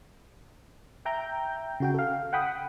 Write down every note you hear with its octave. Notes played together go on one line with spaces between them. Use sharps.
E5 G5 A#5 G6
C#3 F#4 G5
A4 F5
F#5 G5 B5 D#6